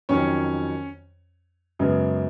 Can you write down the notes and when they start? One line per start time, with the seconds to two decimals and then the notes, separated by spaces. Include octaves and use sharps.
0.09 F2 D#3 F#3 C#4 C#5
1.79 F#2 C#3 G#3 B3